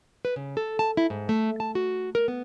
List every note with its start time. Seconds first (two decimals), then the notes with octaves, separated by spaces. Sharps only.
0.25 B4
0.36 C#3
0.57 A4
0.79 A5
0.97 E4
1.10 G#2
1.29 A3
1.60 A5
1.75 F#4
2.15 A#4
2.28 B3